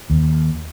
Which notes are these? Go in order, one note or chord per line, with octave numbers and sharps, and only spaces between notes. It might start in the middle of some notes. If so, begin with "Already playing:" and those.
D#2